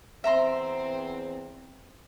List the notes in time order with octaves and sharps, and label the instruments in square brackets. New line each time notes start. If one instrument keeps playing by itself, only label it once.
[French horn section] E2 C4 C5 [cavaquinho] E5 A#5 C6